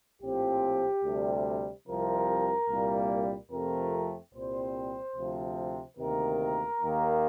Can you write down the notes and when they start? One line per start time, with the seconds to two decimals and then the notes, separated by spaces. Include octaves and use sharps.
0.21 A#1 A2 F3 C4 G4
1.03 D2 C3 G3
1.86 C2 C3 F3 A#4
2.68 C2 A#2 G3 A#3
3.51 F2 C3 F3 A3 C4 A#4
4.34 C2 A#2 G3 C4 C5
5.16 D2 C3 F3
5.97 D2 C3 D#3 A#3 A#4
6.80 D#2 D#3 A#3